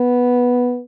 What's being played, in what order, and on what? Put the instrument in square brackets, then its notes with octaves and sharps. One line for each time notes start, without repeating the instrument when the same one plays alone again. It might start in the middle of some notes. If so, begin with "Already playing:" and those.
Already playing: [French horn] B3